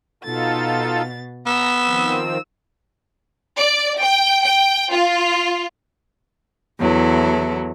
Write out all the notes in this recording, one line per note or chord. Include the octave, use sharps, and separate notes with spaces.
B2 D#4 F4 A4 A6
B3 A#5 E6
D#3 F3 C4
D5
G5
G5
F4
E2 F#3 E4 A4